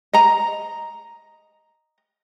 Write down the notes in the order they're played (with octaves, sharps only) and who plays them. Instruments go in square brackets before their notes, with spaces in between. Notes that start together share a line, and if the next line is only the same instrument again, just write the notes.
[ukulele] D#5 A#5